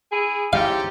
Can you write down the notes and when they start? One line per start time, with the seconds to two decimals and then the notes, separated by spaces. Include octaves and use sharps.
0.12 E4 G#4
0.53 G#2 C#4 E4 G4 F5